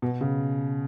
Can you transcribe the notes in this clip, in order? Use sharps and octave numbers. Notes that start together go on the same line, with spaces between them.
B2
C#3